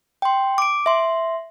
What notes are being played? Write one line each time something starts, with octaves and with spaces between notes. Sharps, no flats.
G5 C6
D6 D7
E5 C6